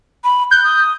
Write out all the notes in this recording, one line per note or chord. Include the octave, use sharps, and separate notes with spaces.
B5
F#6 G6
D#6